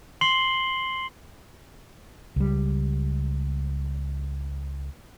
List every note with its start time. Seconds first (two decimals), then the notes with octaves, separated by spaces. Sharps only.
0.21 C6 C7 F#7 G7
2.36 C#2 G3